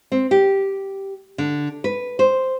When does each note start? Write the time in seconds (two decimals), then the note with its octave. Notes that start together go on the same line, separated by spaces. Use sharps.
0.12 C4
0.31 G4
1.38 D3
1.84 B4
2.19 C5